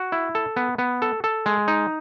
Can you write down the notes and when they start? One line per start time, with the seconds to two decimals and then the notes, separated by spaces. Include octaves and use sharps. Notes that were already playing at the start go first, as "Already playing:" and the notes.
Already playing: F#4
0.12 E4
0.35 A4
0.56 B3
0.78 B3
1.02 A4
1.24 A4
1.46 G#3
1.68 D#4